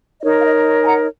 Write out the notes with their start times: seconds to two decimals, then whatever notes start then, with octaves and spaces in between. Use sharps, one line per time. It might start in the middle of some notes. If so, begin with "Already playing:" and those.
0.21 D#4 A#4 C#5 D#5
0.39 F5
0.44 D#5
0.82 G#5
0.86 F#5 A#5